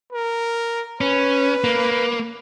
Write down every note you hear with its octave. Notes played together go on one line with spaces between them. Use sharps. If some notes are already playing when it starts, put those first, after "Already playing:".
A#4
C#4 B4
A#3